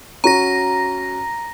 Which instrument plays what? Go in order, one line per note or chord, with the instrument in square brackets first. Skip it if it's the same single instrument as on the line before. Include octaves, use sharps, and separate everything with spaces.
[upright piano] C#4 F#4 [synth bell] A#5 A#6